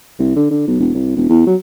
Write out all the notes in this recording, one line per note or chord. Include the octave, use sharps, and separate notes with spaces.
C2
D3
D3
B1
E1
C2
E1
E2
F#3